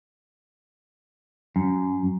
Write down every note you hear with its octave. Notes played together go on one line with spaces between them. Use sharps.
F#2